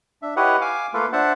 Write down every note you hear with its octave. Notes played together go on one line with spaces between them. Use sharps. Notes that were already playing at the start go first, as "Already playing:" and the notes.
D4 E5
E4 G4 B4 C#5 D#5 F#5
F5 G#5 D6
A3 A#3 F4 A4 B4 F5
D4 C5 E5 F#5 A5